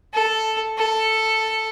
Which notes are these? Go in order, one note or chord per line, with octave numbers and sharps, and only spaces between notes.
A4
A4